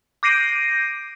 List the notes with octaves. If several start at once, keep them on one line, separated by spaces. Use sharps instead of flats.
D6 G6 A#6 C7 D7 D#7